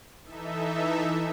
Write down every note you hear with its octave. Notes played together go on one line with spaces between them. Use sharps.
E3 D#4 A4 E5